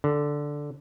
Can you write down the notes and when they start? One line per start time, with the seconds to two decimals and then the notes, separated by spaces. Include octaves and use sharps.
0.04 D3